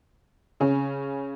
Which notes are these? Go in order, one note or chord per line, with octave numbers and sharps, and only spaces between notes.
C#3 C#4